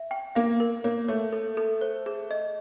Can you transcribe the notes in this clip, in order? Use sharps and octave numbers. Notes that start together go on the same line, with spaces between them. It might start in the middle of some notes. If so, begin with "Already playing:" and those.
Already playing: E5
G5
A#3 F5
A#4
A#3 C#5
A3 C#5
A4
A4
C5
G#4
D#5